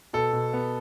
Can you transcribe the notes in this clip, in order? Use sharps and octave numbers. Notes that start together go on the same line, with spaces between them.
B2 A4
B2
B3